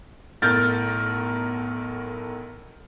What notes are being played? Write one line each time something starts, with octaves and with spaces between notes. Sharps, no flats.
B1 A2 A#4 F6 G6 A6